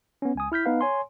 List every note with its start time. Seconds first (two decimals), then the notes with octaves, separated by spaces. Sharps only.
0.22 B3 C#4
0.35 C#2 G#5 D#6
0.52 E4 F6 G6 B6
0.66 B3 D#4 B4 F5
0.81 C#5 G#5 C6